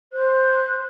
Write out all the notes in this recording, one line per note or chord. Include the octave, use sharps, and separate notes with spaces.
C5 F#6